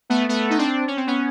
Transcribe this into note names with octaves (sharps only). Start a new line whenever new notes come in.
A3 B3
A3 B3
D#4
C4 D4
C#4
C4
B3 C#4